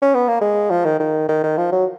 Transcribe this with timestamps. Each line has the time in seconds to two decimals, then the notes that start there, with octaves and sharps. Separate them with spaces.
0.02 C#4
0.15 B3
0.28 A#3
0.41 G#3
0.70 F3
0.85 D#3
0.99 D#3
1.29 D#3
1.43 D#3
1.58 F3
1.72 F#3